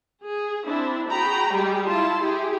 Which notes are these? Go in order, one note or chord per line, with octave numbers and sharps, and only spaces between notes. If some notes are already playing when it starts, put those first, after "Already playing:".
G#4
C4 D4 E4
F#4 G#4 G5 A#5 B5
G3 G#3 G4 G#4
E4 F4 A5 C6
E4 G4 G#4